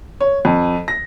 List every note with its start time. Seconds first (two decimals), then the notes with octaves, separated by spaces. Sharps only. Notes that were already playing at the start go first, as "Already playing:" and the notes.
0.21 C#5
0.45 F2
0.88 A#6